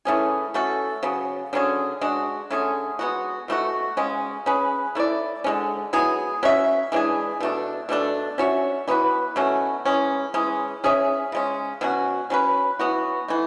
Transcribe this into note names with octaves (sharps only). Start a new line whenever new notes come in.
E3 A3 C#4 G#4
A3 C#4 F#4 A4
C#3 F#3 B3
D3 F#3 C#4 G#4
G#3 D4 F#4
D3 A3 C#4 G#4
G#3 B3 F#4
B2 A3 D4 F#4
C#3 G#3 C#4
C#4 G#4 B4
A3 E4 B4 D5
D3 G#3 C#4
F#3 B3 E4 G#4
C#4 F#4 C#5 E5
E3 G#3 D4 G#4
B2 A3 D4
B2 A3 D4 A4
C#4 F#4 C#5 E5
E3 B3 F#4 B4
B2 A3 C#4 F#4
E3 G#3 C#4
E3 G#3 C#4
C#4 G#4 C#5 E5
C#3 G#3 C#4
B2 F#3 C#4 F#4
F#3 C#4 F#4 B4
E3 B3 F#4
E3 A3